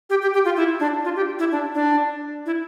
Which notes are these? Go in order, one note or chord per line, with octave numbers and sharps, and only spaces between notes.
G4
G4
G4
F4
E4
D4
F4
G4
E4
D4
D4
E4